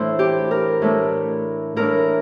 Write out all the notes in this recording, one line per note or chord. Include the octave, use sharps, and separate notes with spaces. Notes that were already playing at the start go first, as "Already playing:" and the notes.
Already playing: A2 E3 A3 D4 C5
G4
A#4
A2 E3 A3 D4
A2 E3 A3 D4 A#4